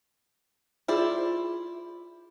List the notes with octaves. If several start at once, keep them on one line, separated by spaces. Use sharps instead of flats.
E4 F4 G#4 C5 D5